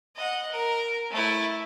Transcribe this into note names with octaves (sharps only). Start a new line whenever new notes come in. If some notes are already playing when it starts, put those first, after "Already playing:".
D#5 F#5
A#4
A3 E4